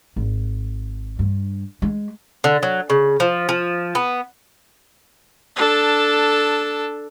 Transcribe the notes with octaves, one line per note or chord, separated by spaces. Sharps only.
G#1
G2
G#3
D3
F#3
C#3
F3
F3
B3
D4 A4